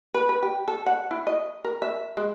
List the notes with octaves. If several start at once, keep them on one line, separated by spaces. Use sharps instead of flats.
B4
B4
G4
A4
F#5
E4
D#5
A#4
E5
G#3